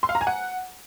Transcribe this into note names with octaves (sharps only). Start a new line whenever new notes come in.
C6
F5
A#5
G#5
F#5